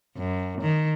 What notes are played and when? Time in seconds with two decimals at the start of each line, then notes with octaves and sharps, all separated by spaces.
0.18 F#2
0.61 D#3